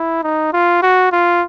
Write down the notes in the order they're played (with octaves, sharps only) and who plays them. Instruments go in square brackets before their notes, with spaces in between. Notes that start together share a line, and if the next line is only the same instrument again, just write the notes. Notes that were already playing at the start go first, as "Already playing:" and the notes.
Already playing: [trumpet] E4
D#4
F4
F#4
F4